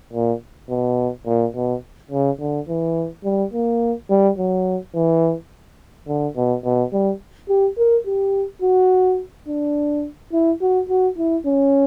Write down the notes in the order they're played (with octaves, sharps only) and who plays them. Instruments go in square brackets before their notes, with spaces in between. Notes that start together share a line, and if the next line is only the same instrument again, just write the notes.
[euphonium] A#2
B2
A#2
B2
C#3
D3
E3
G3
A#3
G3
F#3
E3
D3
B2
B2
G3
G4
A#4
G4
F#4
D4
E4
F#4
F#4
E4
C#4